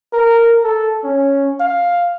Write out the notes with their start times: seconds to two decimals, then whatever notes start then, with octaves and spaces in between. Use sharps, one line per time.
0.13 A#4
0.64 A4
1.04 C#4
1.60 F5